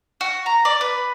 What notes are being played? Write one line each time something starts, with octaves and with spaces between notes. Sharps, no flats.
F#4
A#5
D5
B4